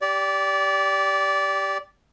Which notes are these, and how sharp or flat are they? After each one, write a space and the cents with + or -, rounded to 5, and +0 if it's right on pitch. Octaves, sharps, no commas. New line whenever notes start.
G4 +0 D5 -20